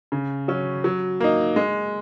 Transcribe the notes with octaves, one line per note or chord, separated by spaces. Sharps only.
C#3
F#3 C#4
F#3
A#3 D#4
G#3